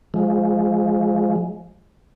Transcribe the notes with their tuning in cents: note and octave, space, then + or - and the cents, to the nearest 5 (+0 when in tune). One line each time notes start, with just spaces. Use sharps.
F3 +0 G#3 +10